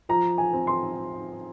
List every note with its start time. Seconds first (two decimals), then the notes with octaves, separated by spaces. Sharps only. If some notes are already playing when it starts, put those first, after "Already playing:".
0.09 F3 A#5
0.38 G#5
0.53 C4
0.67 C6